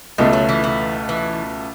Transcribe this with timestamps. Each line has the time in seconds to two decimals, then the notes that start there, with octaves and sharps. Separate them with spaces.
0.18 C#2 B2 G#3 A3
0.33 F#3
0.49 E3
0.64 E3
1.09 E3